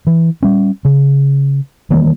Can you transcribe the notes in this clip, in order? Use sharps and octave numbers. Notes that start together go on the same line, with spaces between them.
E3
G3 C#4
C#3
D#3 E3 G3 A#3